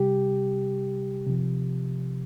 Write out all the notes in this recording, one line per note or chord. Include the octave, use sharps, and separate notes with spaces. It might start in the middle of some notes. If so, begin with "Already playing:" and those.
Already playing: C3 G3 G4
C3 F3